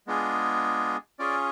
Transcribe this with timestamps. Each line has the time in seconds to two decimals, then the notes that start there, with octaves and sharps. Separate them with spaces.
0.07 G#3 B3 D4 F4 G#4
1.19 C#4 F4 G#4 D5